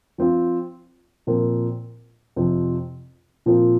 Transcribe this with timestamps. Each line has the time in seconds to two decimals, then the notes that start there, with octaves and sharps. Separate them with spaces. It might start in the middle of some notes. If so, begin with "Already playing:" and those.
0.18 F3 C4 F4
1.27 A#2 F3 C4 A#4
2.36 F2 C3 F3 C4
3.46 A#2 F3 C4 F4 A#4